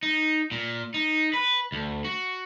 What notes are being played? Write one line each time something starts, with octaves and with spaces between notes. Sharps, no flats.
D#4
A#2
D#4
B4
D2
F#4